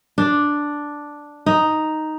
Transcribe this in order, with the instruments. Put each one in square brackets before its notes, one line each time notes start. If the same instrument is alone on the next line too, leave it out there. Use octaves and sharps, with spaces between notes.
[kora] D4
D#4